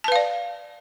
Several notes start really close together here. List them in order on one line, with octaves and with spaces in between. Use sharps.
A5 B4 F5 D5